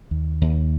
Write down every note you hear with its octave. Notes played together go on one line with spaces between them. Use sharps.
D#2
D#2